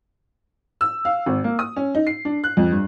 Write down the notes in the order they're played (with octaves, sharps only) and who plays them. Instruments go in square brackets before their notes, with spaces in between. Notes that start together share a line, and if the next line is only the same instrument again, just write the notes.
[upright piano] E6
F5
G#1
A#3
D#6
C#4
D#4
C7
D4
F#6
F2
G2